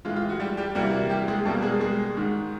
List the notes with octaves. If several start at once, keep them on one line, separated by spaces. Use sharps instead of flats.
A2 E3 G#3 F4
F4
F#4
G3 G4
G3 G4
C3 E3 G3 A#3 F#4
F#4
G3 G4
G#3 G#4
B2 G3 A3 A#3 A4
G#3 G#4
G#3 G#4
G#2 D#3 G#3